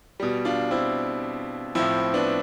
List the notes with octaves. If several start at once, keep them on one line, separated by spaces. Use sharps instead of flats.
B2 G3
D4 F4
C4 E4
A2 F3 C4 E4
B3 D4